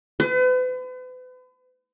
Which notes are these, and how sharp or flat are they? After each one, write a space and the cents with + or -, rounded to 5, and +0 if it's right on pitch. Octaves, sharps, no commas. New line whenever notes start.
B4 +40